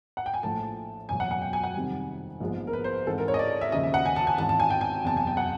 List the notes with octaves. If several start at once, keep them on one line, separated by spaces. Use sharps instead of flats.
F#5
G5
G#5
A#1 A2 F3 A3 A5
F#1 E2 B2 F#3 G#5
F#5
F#5
G5
G#5
F#5
F2 C3 D#3 G3
A#1 G#2 F3 G#3 B3
A#4
B4
C5
G#2 E3 G#3 C4 A4
A#4
C#5
D#5
D5
E5
D#2 C#3 F3 D#5
E5
F#5
G#5
A5
G#5
G#1 G#2 E3 A5
A5
G#5
G5
G#5
F#1 E2 C3 A5
G#5
G5
F#5